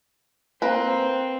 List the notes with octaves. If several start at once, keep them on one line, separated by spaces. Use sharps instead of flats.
A#3 C4 B4